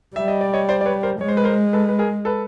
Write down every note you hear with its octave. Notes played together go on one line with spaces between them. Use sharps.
G3 E5
D#5
D5
C#5 D#5
C5 D5
D5
B4 C#5
A#4 C5
G#3 C#5
C5
B4
A#4 C5
A4 B4
B4
G#4 A#4
A4 B4